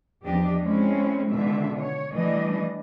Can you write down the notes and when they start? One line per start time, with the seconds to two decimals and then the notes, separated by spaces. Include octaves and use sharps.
0.24 E2 F3 D4 G4 D#5
0.62 G#3 A3 C4 C#4 E4
1.31 B2 D3 D#3 G#3 F4 E5
1.77 C#5
2.13 E3 G3 A3 D4 D#5